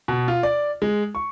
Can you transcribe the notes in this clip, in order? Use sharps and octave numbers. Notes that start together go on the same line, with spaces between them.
B2
F4
D5
G#3
C#6